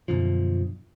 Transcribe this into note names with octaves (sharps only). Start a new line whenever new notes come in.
F#2 B2 D3 F3